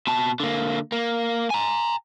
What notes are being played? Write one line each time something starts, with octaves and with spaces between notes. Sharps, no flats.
B2 A5
D3 A#3
A#3
G#5 A#5